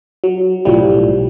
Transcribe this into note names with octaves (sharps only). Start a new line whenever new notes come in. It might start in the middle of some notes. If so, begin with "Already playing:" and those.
F#3
B1 A2 F3 G3